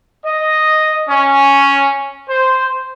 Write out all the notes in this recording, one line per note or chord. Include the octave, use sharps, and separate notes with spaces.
D#5
C#4
C5